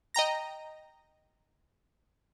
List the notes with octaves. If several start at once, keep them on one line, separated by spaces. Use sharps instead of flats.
D#5 G5 A#5 A#6